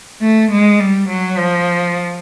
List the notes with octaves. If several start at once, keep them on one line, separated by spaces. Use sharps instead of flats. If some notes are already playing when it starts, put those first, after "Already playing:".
A3
G#3
G3
F#3
F3